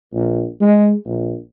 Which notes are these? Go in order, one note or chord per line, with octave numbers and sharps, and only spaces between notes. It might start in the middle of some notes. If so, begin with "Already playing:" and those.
A#1
G#3
A#1